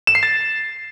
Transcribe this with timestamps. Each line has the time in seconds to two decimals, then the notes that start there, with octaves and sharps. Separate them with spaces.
0.07 E7
0.15 C7
0.23 A6